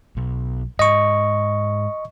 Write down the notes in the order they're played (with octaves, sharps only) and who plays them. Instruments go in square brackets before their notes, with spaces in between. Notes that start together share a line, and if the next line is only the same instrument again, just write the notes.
[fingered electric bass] B1
[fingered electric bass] G#2 [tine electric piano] D#5 C#6